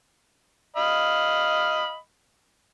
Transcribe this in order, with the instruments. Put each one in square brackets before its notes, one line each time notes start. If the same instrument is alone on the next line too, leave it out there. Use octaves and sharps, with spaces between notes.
[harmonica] D#5 F5 B5